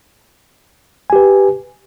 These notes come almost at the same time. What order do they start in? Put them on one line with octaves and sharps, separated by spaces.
G#5 G4 B4